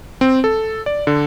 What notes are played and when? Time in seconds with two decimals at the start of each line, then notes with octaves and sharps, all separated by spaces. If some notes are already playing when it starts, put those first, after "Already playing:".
0.21 C4
0.44 A4
0.86 D5
1.07 D3